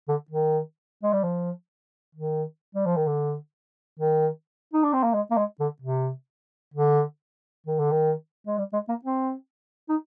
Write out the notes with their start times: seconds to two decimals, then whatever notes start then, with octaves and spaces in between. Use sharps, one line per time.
0.09 D3
0.31 D#3
1.03 G#3
1.13 G3
1.24 F3
2.15 D#3
2.75 G3
2.86 F3
2.97 D#3
3.07 D3
3.99 D#3
4.74 D#4
4.84 D4
4.94 C4
5.04 A#3
5.14 G#3
5.31 A#3
5.37 G#3
5.60 D3
5.82 C3
6.74 D3
7.67 D#3
7.79 D3
7.92 D#3
8.47 G#3
8.58 G3
8.73 G#3
8.89 A#3
9.05 C4
9.89 D#4